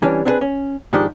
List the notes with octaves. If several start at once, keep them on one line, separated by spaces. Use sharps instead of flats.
C3 E3 G3 C#4 D4
C4 D4 E4 G4 G#4 B4
C#4
G#2 D#3 F3 G#3 D4 G4